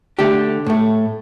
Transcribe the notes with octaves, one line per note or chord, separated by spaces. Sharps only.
D3 A3 G4
A2 A3